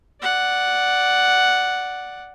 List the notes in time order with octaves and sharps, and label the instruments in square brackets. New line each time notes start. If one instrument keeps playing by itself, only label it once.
[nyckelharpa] D5 F#5